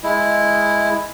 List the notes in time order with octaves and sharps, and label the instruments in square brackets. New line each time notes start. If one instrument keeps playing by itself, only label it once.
[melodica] G#3 E4